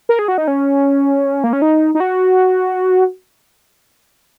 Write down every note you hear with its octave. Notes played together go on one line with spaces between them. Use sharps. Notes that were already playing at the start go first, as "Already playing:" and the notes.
A#4
G#4
F#4
D#4
C#4
A#3
C#4
D#4
D#4
F#4